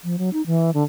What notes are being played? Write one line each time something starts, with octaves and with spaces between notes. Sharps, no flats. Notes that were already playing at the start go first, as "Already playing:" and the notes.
F3
F#3
D#4
E3
D3